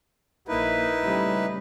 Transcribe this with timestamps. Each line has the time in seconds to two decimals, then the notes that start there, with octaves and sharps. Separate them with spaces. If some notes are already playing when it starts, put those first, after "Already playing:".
0.48 A#1 A#3 D#4 E4 B4
1.02 C#3 G3 A3